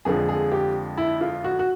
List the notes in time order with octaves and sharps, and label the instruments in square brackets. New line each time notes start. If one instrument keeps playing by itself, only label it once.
[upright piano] F2 D3 F3 G#3 G#4
G#4
G4
E4
F4
F#4
F#4